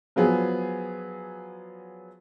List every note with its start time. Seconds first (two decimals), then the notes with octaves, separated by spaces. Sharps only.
0.16 F3 F#3 B3 G#4